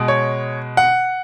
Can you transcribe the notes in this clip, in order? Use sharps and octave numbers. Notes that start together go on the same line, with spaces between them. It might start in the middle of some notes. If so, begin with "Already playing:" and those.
Already playing: B2 G#3
C#5
F#5